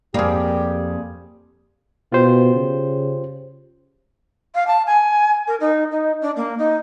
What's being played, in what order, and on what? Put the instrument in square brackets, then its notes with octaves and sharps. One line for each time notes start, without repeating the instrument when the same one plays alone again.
[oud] F2 A#3 [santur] G3 C4 G#4 [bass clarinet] G4
[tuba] B2 [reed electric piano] F4 G4 C5
[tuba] C#3
[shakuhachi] F5
A5
G#5
A#4
D#4
D#4
D4
A#3
D#4